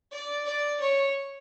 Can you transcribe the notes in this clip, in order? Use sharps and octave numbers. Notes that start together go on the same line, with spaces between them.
D5
D5
C#5